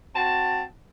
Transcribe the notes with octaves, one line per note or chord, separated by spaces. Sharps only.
C4 F#4 A5